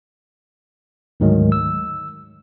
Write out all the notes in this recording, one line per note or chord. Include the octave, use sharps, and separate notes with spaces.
D2 G#2 D#3 F#3 G#3
E6